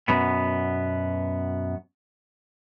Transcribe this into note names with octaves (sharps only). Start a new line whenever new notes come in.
F#2 B2 B3